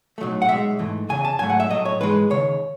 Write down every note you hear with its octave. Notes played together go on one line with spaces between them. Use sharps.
B1 A2 F#3 A3
F#5
B1 B2 G#3 E5
G#2 E3 A3
E2 C#3 G#5
A5
G#2 F#3 A3 G#5
F#5
E5
A2 F#3 A3 D#5
C#5
G#2 E3 G#3 B4
D#2 C#3 C#5